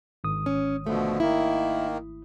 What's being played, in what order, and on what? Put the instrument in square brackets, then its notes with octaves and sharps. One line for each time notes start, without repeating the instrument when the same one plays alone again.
[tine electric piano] G#1 D#6
[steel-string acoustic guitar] C#4
[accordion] B2 D3 F3 [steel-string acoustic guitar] A3
[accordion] D#3 A#3 [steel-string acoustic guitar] E4